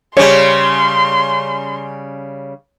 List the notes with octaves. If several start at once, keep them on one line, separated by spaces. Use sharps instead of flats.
C#3 G3 C#5 C6